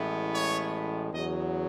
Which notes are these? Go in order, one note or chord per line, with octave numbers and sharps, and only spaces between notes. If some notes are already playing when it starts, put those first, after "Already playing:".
Already playing: A1 A2 G#3 B3 E4
C#5
E2 C#3 F#3 D#5